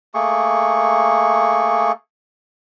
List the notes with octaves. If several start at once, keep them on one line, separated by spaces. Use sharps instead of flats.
A3 A#3 G#4 C#6